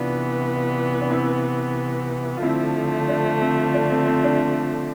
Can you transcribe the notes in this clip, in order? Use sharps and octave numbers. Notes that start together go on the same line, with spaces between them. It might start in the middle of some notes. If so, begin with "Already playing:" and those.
Already playing: C3 E3 B3 D4 F4
D4
C4 E4
F4
D3 F3 A3 C4 E4
D4
C4
D4
C4
C4
D4